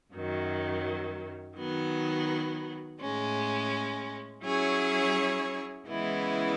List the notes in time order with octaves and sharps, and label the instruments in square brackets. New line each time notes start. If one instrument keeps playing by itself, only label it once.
[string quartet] F#2 D#3 F#3
D#3 F#3 B3
A2 G#3 C#4
F#3 C#4 E4 G#4 C#5
C#3 E3 G#3 B3 E4